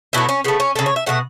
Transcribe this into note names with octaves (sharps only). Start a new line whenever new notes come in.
B2 F#3 A3 E4
C#4
C#3 A3 B3
C#4
C#3 A3 A4
C#5
E5
B2 F#3 A3 F#5